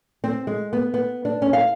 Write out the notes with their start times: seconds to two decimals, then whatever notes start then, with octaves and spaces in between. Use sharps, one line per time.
0.24 C4
0.47 G#3
0.73 B3
0.94 B3
1.25 D4
1.42 C#4
1.53 F5